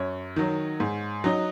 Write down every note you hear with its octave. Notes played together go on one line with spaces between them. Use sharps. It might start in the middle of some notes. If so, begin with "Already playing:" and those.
Already playing: F#2 C#5
D#3 F#3
G#2
F#3 D#4